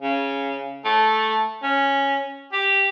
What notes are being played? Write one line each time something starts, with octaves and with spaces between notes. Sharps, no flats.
C#3
A3
C#4
G4